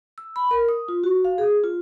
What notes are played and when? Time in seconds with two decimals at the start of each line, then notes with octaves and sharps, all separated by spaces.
0.18 E6
0.36 B5
0.51 A#4
0.69 D#6
0.88 F4
1.04 F#4
1.25 F5
1.38 G#4
1.64 F4